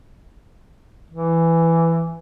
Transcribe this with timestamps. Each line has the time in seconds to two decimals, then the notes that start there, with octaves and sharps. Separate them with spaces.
1.10 E3